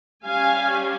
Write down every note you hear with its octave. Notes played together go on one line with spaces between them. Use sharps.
G3 C#4 F5 G#5